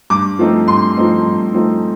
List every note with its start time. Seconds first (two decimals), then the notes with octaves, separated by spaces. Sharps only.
0.10 G2 D6
0.39 F3 A3 C4 D#4
0.68 G2 C6
0.97 F3 A3 C4 D#4
1.25 G2
1.54 F3 A3 C4 D#4